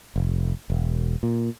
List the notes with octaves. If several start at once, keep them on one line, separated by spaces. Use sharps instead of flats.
F1
E1
A#2